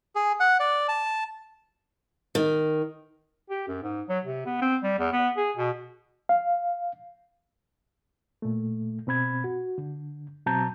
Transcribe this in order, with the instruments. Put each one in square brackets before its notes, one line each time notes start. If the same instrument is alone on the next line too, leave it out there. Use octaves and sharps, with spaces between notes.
[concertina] G#4
F#5
D5
A5
[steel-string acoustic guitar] D#3
[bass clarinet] G4
F#2
G#2
F#3
C3
B3
C4
G3
E2
B3
G#4
B2
[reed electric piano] F5
A#2 A3
B2 C4 B5 G#6
F#4
D3
B2 F#3 C4 A5 A#5 G6